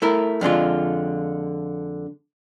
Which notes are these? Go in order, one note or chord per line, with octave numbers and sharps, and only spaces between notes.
A3 E4 A#4
F2 D3 G#3 F4